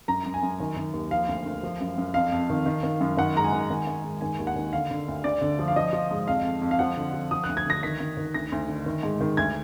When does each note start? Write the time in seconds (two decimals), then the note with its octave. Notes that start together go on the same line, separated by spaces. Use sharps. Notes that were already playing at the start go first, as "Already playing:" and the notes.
0.08 F#2 A#5
0.26 F#2
0.34 G#5
0.43 F#2
0.60 D#3
0.77 D#3
0.94 D#2
1.11 F3 F5
1.28 D2
1.46 D2
1.63 F3
1.81 F#2
1.98 F#2
2.14 F2 F5
2.32 F2
2.50 D#3
2.66 D#3
2.83 D#3
3.01 F#2
3.17 D#3 F#5
3.36 G#2 A#5
3.44 G#5
3.53 D#3
3.70 D#3
3.87 D#3
4.04 G#2
4.21 D#3 G#5
4.39 D#2
4.47 F#5
4.56 D#3
4.73 D3 F5
4.91 D3
5.08 D2
5.24 D2 D5
5.41 D3
5.59 F3
5.68 F5
5.76 F3 D#5
5.93 F3
6.11 G#2
6.27 F2 F5
6.44 F2
6.62 F2
6.71 F5
6.79 F3 F#5
6.97 D3
7.14 F3
7.31 F3 D#6
7.44 F#6
7.49 D2
7.57 G#6
7.66 D3 A#6
7.83 D#3 B6
8.00 D#3
8.17 D#3
8.34 D2 A#6
8.52 D2
8.68 D3
8.86 D#3
9.03 G#2
9.21 D#3
9.37 D2 G#6